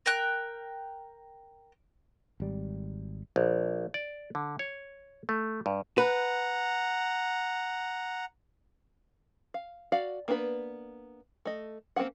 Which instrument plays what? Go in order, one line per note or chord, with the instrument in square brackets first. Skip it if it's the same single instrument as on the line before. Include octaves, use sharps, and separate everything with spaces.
[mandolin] A#4 G5 F#6
[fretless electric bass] G#1 G3
[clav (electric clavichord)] A#1
D5
D3
C#5
A3
G2
[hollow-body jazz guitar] B4 [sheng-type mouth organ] F#5 A#5
[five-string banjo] F5
F#4 D5 F5
A#3 B3 D4 A4 B4
A3 D#5
A#3 C4 C#4 G#4 F#5